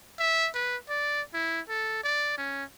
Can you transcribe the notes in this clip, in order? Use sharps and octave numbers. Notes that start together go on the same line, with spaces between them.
E5
B4
D5
E4
A4
D5
C#4